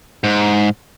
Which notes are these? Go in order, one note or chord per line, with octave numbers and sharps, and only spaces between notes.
G#2